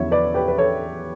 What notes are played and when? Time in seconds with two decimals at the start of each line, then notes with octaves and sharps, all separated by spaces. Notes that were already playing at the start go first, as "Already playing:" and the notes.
Already playing: E2 D3 F#3 C#4 E4 C#5 E5
0.11 B4 D5
0.34 G4 B4
0.48 B4
0.58 A4 C#5